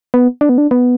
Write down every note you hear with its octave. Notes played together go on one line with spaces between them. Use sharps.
B3
D4
B3
D4
B3